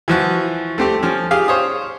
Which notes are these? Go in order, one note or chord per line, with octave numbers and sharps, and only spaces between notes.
E3 F3 F#4
A3 C4 G4
F3 C#4
G4 G#4 F5
C5 C#5 D#6